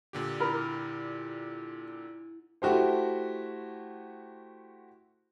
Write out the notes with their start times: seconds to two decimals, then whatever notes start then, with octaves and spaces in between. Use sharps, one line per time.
0.13 A#2 D3 G4
0.40 E4 A#4 B5
2.62 A3 E4 F#4 G4 C5